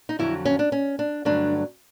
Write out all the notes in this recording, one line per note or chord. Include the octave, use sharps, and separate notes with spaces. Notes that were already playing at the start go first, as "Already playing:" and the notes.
D#4
F2 D3 F#3 E4
C#4
D4
C#4
D4
G2 D3 F#3 A3 D4